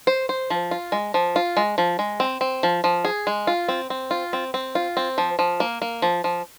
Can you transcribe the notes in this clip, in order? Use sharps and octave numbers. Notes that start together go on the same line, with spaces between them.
C5
C5
F3
F4
G#3
F3
F4
G#3
F3
G#3
C4
C4
F3
F3
G#4
G#3
F4
C4
C4
F4
C4
C4
F4
C4
F3
F3
A#3
A#3
F3
F3